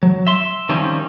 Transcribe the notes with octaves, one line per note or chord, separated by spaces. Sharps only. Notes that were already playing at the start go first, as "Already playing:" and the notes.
F#3
E5 C6
D#3 F3 G3 C4 C#4